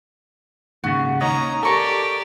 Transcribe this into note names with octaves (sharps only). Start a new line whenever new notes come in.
D#2 G#2 C#3 F#4
C#4 D#4 C#5 D#5 A#5
G4 A4 A#4 D5 G#5 C#6